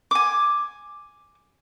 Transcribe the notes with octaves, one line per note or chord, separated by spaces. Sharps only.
G#5 D6